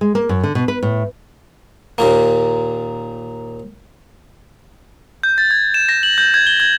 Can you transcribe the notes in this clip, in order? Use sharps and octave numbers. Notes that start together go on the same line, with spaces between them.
G#3
A#3
F#2
D3
B2
B4
A2
D#2 A#2 A#3
G6
A6
G#6
E7
A#6
F#7
G6
G#6
G7
G#6